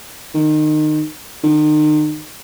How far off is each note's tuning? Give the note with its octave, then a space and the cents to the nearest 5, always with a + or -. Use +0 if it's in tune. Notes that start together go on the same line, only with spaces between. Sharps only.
D#3 -25
D#3 -35